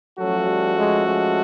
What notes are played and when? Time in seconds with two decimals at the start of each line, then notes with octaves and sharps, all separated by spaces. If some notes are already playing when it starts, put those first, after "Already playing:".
0.19 F3 F#3 A3 C#4 F#4 A4
0.48 G3
0.78 G#3
1.08 G#3